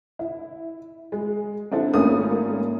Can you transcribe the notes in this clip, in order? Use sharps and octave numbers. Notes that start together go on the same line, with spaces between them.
E4
G#3
C4 D4 E4 A4
G#1 A3 A#3 C#4 D#6